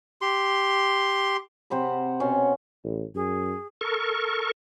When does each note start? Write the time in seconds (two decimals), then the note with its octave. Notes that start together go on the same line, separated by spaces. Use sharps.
0.21 G4 C6
1.70 C3 C5 F#5 B5
2.20 B2 C#4 C6
2.84 A1
3.15 F#2 G#4
3.81 A4 A#4 C#6